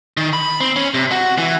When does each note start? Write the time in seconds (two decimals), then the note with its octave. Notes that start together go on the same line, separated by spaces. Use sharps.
0.17 D#3
0.33 B5
0.60 C4
0.76 C#4
0.94 C3
1.11 F#4
1.38 E3